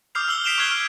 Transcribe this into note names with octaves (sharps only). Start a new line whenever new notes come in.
D6 D#6 F6 G6 C7 F7
E6 F#7 G7
B6 C7 D7 E7 F7 G7
C#6 F6 F#6 G#6 D7 G7
F6